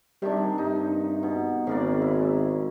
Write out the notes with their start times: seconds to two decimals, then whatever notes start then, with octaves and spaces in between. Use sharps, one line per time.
0.22 C3 D#3 G3 D4
0.58 G2 D#4
1.23 B2
1.67 G#1 C#3 A#3 D5
2.02 E4